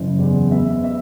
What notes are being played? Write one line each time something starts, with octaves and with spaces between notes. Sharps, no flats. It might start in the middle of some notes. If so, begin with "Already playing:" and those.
Already playing: F#1 E3
E2
B3 E5
E5